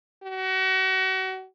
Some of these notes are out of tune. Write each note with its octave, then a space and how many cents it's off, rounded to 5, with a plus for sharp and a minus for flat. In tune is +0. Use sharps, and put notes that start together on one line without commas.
F#4 +35